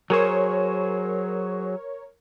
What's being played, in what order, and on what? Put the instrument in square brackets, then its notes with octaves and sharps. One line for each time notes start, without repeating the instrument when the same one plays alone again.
[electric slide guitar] F#3 G#4 C5 [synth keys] A#4 C#5